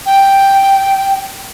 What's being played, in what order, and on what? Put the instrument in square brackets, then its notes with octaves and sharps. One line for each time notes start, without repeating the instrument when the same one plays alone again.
[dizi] G5